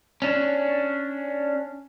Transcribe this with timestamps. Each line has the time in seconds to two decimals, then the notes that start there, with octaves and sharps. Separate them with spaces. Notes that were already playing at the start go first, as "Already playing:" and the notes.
0.22 C#4 D4